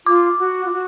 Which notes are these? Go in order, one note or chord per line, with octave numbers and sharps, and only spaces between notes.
F4 D6
F#4
F4
F#4